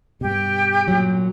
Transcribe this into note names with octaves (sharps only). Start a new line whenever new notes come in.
G2 B2 G4
A#2 F#3